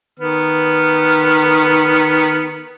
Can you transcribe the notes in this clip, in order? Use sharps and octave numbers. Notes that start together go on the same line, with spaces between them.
D#3 B3 F6